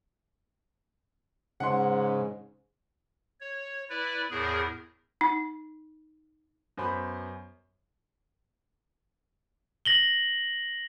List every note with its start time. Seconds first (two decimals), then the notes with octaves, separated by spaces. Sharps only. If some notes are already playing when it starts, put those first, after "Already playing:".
1.60 G#2 C#3 F#5 C6
3.41 C#5
3.90 E4 B4 D5
4.31 E2 A2 G#4 A#4
5.21 D#4
6.77 F#2 B3 C5 B5
9.85 A#6 F#7 G7